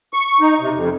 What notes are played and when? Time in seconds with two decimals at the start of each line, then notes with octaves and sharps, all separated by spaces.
0.13 C#6
0.40 D#4
0.60 C3
0.75 F2